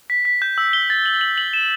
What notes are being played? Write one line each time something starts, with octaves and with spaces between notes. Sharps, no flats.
B6
B6
G6
E6
G7
A6
F#7
F#7
F#7
E7